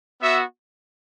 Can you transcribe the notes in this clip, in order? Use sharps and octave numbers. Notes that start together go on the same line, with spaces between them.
B3 F#4 E5